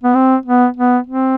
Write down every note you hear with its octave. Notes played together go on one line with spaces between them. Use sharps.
B3
C4
B3
B3
C4